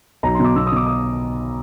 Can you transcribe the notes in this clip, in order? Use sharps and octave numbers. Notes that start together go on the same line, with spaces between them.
B1 A#5
B2 C6
D6
B2 E6
D#6
B2 D6
D#6